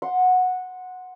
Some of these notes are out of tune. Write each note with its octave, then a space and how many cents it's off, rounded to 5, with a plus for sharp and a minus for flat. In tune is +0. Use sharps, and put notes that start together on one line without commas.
F#5 -10 C6 +0